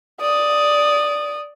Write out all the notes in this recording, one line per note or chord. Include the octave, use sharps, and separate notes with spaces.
D5 D#6